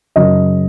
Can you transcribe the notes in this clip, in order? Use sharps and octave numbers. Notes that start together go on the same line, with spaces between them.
F#2 C#3 F#3 D#5